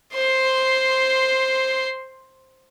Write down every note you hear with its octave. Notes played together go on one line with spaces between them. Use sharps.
C5 C6